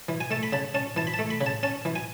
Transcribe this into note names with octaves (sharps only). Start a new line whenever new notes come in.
E3
G#5
A3 A5
B5
C#3 A5
C#4 A5
E3 A5
B5
A5
A3
B5
C#3
A5
C#4 A5
E3
G#5